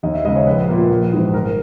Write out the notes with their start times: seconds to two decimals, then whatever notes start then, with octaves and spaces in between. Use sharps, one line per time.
0.03 D#2 D#5
0.14 E5
0.25 C#3 G#3 D#5
0.36 C#5
0.46 A#1 B4
0.68 A#2 A#3
0.91 A#1
1.12 G#2 E3 G#3
1.34 G1 A#4